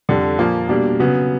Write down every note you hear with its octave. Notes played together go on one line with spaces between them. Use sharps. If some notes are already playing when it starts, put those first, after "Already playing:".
F2 D3 G3
A#2 F3 A#3
B2 G3 A#3 D4
C#3 F#3 B3